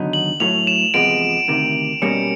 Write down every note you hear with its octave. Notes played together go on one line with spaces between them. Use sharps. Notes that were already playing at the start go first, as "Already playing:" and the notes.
Already playing: D#2 D3 F#3 B3 D#4
F#7
A2 F#3 A3 F7
E7
E2 C3 F3 G#3 B3 D7
D2 C3 D#3
B2 G3 A#3 C#4 C#7